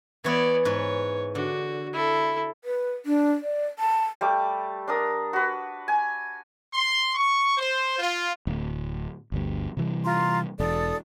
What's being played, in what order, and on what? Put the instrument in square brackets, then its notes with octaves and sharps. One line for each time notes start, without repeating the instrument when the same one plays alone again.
[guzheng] E3 C#5 E5 [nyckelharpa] B3 D5
[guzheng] G#2 B4 [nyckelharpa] C#5
[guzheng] D3 [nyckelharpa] F#4
[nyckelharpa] E4 A4
[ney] B4
D4
D5
A5
[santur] G3 A3 D6
D4 A#4 D#6
F#4 B4
G#5
[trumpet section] C6
C#6
C5
F4
[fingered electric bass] D1
G1 D2 G2
C3 E3 G3
[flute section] F4 A#5 C6
[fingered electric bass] E1 [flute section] A4 D5 D#6